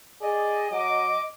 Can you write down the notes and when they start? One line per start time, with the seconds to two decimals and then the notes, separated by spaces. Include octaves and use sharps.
0.22 G#4 D5 D#5
0.71 F#3 D6